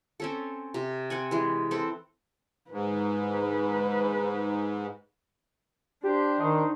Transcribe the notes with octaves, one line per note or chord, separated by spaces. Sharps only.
C4 C#4 A4
C3
C4 F#5 G#5
E3 G#3
C4 A4 B4
G#2 B4
D4 G4 C5
D#3 D#4